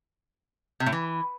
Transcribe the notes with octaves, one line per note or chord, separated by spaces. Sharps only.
C3
A2
E3